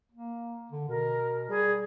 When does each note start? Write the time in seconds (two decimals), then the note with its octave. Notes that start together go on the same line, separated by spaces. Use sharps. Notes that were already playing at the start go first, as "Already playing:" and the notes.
0.12 A#3
0.71 D3
0.88 B2 A#4
1.49 G3 G#4